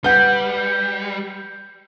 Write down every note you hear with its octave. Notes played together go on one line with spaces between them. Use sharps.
G3 B4 F#5 G6